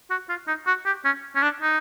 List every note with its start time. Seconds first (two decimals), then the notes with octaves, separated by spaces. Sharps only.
0.10 F#4
0.29 F4
0.47 D#4
0.67 F#4
0.86 G4
1.05 C#4
1.36 C#4
1.42 D4
1.62 D#4